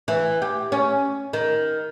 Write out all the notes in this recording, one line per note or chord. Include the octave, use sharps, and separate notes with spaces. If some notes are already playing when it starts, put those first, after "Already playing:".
E3
G4
C#4
D#3